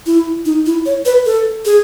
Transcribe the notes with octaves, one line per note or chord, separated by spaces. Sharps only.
E4
D#4
E4
C#5
B4
A4
G#4